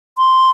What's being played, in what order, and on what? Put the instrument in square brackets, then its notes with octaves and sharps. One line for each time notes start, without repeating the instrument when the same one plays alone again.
[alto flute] C6